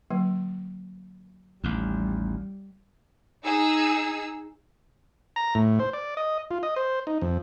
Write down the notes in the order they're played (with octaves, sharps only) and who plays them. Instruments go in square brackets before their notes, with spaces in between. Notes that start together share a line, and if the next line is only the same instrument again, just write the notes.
[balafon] D3 F#3 A#3
[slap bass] A1 D#2 [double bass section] G3
[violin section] D#4 G#4 E6
[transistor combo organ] A#5
A2
C5
D5
D#5
F4
D#5
C5
D#4
F2